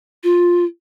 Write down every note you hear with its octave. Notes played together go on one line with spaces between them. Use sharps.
F4